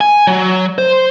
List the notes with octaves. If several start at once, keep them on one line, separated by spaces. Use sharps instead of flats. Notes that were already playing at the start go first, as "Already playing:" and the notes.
G#5
F#3
C5